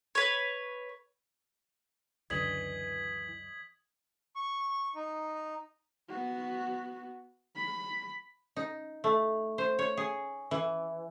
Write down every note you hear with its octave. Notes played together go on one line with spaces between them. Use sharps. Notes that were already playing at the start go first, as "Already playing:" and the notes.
B4 C#5
C#2 F#2 D3 E3 D#5 G#6 B6 F#7
C#6
D#4
B3 F#4
B5
D#4
A3
C5
C#5
G#4
E3